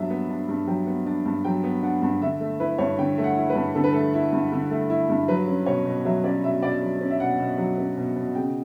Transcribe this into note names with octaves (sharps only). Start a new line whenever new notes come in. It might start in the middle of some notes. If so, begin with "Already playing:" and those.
Already playing: G2 F#3 B3 D4 E5
B3
D4
G2
F#3 G5
B3
D4
G2
F#3 G5
B3
D4 F#5
G2
D3 E5
A3
E4 B4
G2 C#5
D3 G5
A3
F#5
E4
B4
G2
D3 A4
B4
A3 A4
E4
G2
D3
A3
E4
G2
F#3 B4
C#4
B2 C#5
B2
F#3 E5
C#4 D5
B2 E5
B2 D5
F#3
C#4
E5
B2 F#5
B2
F#3
C#4
B2
B2
C#3 G5